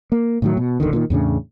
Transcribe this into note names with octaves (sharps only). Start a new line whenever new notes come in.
A#3
A2 D#3 F#3
B2
D1 G1 D3 D#3
A#2 D3 D#3
E2 A2 C#3 D4